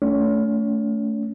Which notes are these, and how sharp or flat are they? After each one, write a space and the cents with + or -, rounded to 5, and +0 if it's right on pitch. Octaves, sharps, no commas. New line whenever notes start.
A3 +0 C#4 +35